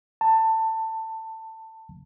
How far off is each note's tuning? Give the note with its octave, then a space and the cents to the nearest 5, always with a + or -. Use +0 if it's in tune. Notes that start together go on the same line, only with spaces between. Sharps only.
A5 +20